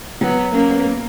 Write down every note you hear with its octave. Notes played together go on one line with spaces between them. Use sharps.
F#3 B3
A#3 C#4
B3
A#3